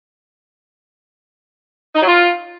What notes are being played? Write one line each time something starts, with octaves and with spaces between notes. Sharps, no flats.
D#4
F#3
F4